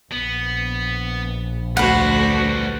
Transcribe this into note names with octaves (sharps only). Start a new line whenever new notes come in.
A#1 B3
D2 G3 F#4 B4 C5 F#5